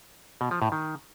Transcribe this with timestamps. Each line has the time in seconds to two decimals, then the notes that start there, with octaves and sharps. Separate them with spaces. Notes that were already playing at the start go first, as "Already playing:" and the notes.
0.41 B2
0.51 F3
0.62 A2
0.72 D#3